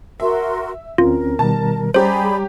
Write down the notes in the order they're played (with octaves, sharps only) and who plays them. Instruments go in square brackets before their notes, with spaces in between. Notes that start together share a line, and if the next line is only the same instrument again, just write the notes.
[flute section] F#4 A#4 C6 [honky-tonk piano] E5
[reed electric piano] D2 C4 C#4 [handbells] F4 [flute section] A#4
[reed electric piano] B2 D#3 G3 [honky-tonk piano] A5
[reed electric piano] G3 A#5 [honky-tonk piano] C#4 G4 [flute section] G#4 D5 B5 [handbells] C5